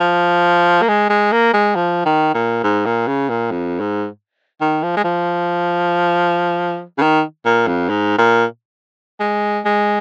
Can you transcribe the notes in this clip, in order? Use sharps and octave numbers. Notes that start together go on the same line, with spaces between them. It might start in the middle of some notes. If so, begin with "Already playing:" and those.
F3
A#3
G#3
G#3
A#3
G#3
F3
D#3
A#2
G#2
A#2
C#3
A#2
F2
G#2
D#3
F3
G#3
F3
C#3
D#3
A#2
F2
G#2
A#2
G#3
G#3